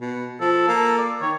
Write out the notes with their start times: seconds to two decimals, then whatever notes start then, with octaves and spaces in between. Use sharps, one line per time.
0.01 B2
0.41 F3 A4
0.68 A#3
0.98 D5
1.22 D#3 C#5